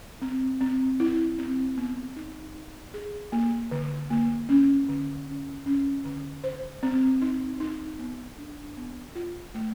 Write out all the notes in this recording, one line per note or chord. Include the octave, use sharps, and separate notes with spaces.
C4
C4
E4
C4
B3
D#4
D#4
G#4
A#3
D3
A#3
C#4
D3
C#4
C#4
D3
C5
C4
D#4
D#4
B3
D4
B3
F4
A3